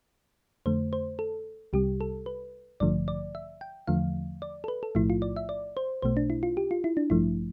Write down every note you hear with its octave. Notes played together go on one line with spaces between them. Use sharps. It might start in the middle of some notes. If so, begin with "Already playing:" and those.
F2 D3 A3 C5
C5
A4
C2 C3 G3 G4
A4
B4
A1 G2 D3 F3 A3 D5
D5
E5
G5
E2 D3 F3 A3 F5
D5
A4
B4
A4
B1 A2 F3 A3 E4
F4
D5
E5
D5
C5
B1 B2 A3 C5
D4
E4
F4
G4
F4
E4
D4
A1 G2 F3 A3 E4